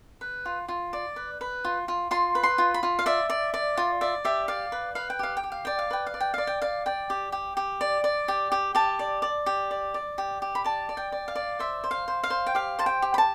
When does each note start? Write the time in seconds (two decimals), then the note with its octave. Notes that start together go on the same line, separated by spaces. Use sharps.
0.21 B4
0.46 F4
0.68 F4
0.93 D5
1.16 B4
1.41 B4
1.65 F4
1.88 F4
2.11 F4 C6
2.35 B4
2.43 C6
2.58 F4
2.74 B5
2.83 F4
2.99 F5
3.06 D5 E5
3.30 D5
3.54 D5
3.77 F4
4.01 D5 E5
4.25 G4 E5
4.48 D5 F5
4.72 B4
4.95 B4 F5
5.10 G5
5.19 G4 F5
5.37 G5
5.44 G4
5.52 F5
5.65 D5 G5
5.79 F5
5.91 B4 G5
6.06 F5
6.14 D5
6.20 G5
6.34 D5 F5
6.47 G5
6.62 D5 F5
6.86 D5 G5
7.10 G4
7.32 G4
7.57 G4
7.81 D5
8.04 D5
8.28 G4
8.52 G4
8.75 G4 A5
8.99 D5
9.22 D5
9.46 G4
9.71 D5
9.94 D5
10.18 G4
10.42 G4
10.55 B5
10.64 D5 A5
10.89 D5
10.97 G5
11.12 D5
11.28 F5
11.35 D5
11.59 C5 E5
11.84 C5
11.91 F5
12.08 C5
12.24 F5
12.30 C5
12.46 G5
12.55 G4 F5
12.79 C5 A5
12.86 G5
13.02 G4
13.14 B5
13.18 A5